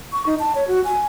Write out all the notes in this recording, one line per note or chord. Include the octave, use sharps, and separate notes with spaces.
C#6
D#4
A5
C#5
F#4
G#5